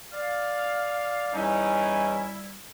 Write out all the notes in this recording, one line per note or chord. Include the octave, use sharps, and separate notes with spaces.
D5 F5
E2 G3 C#4 D#4 E4